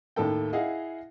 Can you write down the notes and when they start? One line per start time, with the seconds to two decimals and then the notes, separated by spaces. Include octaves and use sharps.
0.16 D#2 A2 A#3 A4 G5
0.53 E4 G#4 D#5 F5 F#5